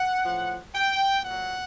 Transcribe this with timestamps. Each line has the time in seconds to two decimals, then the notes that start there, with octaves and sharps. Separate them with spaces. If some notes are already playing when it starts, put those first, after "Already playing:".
Already playing: F#5
0.25 A2 F3
0.74 G5
1.23 A#2 F#3 F#5